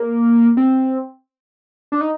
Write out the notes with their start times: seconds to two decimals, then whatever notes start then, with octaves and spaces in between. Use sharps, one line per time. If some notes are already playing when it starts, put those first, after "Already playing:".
Already playing: A#3
0.57 C4
1.92 D4
2.01 D#4